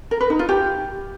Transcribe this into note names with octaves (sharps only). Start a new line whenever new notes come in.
A#4
B4
D#4
F4
G4